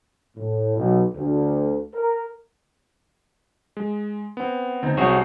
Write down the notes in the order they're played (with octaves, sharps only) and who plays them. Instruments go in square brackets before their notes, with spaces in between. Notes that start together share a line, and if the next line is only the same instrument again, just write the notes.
[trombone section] A2
B1
D2
A#4
[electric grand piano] G#3
B3 C4
[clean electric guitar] D2 [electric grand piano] C4 D#4
[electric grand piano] C2 G#4 D#6 [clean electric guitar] C4 F#4 C#5